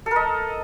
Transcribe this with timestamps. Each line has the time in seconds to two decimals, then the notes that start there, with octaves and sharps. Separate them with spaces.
0.06 A4
0.11 A#4
0.16 D#5